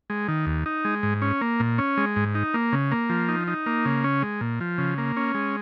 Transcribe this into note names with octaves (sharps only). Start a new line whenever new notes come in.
G#3
D#3
D#2
D#4
G#3
G#2
C#4
A#3
A#2
C#4
G#3
G#2
D#4
A#3
C#3
A#3
F3
D#4
D#4
A#3
C#3
C#4
G#3
A#2
F3
C#3
A#3
C#4
G#3